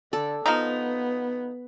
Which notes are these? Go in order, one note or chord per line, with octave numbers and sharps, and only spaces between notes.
D3 A4 D5
F3 B3 D#4